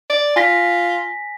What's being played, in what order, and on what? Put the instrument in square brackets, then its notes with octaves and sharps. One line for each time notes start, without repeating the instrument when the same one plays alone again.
[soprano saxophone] D5
[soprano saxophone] F4 [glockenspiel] G#5 A#6 B6